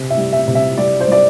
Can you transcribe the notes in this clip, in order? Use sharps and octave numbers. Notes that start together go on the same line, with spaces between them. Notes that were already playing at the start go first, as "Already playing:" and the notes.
Already playing: C3
E5
G3
E5
C3
E5
G3 D5
C5
G3 D5